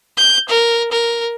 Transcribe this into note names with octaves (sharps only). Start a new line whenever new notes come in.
G6
A#4
A#4